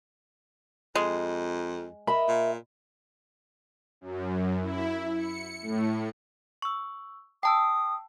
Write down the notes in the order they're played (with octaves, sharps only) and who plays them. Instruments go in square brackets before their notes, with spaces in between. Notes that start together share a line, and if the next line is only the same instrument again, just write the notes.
[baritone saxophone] F2 [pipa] G#3
[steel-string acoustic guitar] A#4 D#5 E5 [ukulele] B5
[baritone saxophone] A#2
[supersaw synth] F#2
E4
C#7
A2
[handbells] C#6 E6
[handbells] G5 A5 E6 [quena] D#6